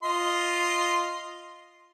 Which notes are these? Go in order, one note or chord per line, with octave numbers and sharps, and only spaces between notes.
F4 D#5 C6